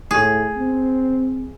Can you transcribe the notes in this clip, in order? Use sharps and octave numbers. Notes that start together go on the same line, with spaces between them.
A2 G#4
C4